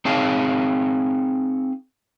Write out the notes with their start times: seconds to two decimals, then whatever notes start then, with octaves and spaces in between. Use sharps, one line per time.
0.05 C4 D#4 G#4 C#5 F5 A5